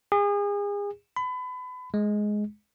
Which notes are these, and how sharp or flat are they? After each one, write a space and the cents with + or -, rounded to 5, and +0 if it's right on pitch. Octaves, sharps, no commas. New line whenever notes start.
G#4 -35
B5 +30
G#3 +10